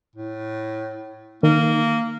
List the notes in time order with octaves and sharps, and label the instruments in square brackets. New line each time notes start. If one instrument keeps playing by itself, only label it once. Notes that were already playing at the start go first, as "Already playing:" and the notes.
[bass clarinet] A2
[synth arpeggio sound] D#3 [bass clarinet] A#3